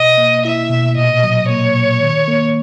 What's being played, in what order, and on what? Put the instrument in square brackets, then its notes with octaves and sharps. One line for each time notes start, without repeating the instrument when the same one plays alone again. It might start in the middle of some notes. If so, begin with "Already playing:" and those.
Already playing: [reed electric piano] B2 [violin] D#5
[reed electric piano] A#3
[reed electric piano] E4 [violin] E5
[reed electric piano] B2
[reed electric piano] A#2 [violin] D#5
[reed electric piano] F#3
[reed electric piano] A#3 [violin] C#5
[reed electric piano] A#2
D#3
A#3